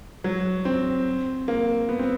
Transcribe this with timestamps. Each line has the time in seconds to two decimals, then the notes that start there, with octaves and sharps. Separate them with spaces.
0.24 F#3
0.65 C4
1.48 A#3
1.89 B3
1.99 C4